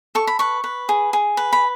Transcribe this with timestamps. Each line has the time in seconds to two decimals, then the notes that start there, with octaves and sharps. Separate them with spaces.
0.15 A4 C#6
0.27 B5
0.39 B4 C#6
0.64 B4
0.89 G#4
1.13 G#4
1.37 B4
1.53 B5